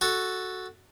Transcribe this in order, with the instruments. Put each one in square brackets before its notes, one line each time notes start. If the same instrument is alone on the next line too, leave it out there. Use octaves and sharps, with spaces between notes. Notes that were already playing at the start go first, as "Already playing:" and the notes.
[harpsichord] F#4 A4